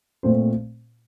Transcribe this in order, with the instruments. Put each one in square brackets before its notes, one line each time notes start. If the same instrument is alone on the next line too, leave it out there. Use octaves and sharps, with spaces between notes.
[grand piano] A#2 A3 C4 C5